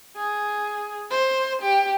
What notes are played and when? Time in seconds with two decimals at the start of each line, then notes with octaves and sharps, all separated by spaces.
0.16 G#4
1.11 C5
1.62 G4